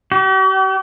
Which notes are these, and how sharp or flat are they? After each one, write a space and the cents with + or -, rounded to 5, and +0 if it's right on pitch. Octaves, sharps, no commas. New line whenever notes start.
G4 -45